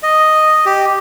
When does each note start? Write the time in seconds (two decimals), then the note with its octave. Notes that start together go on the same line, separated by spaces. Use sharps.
0.03 D#5
0.66 G4